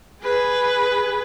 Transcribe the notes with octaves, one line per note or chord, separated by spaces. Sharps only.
G#4 B4